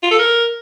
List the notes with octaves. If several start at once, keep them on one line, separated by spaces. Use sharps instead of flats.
F4
A4
A#4